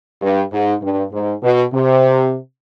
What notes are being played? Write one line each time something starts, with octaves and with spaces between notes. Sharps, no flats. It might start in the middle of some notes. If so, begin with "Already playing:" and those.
G2
G#2
G2
G#2
B2
C3